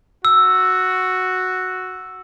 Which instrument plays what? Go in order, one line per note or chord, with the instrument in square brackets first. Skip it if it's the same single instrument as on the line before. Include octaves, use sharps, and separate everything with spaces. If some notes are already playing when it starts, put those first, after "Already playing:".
[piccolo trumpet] F#4 [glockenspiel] E6